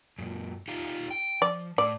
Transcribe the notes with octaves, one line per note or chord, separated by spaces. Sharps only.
F#2 A#2
D#4 F4 G4
G5
F3 D5
A2 D5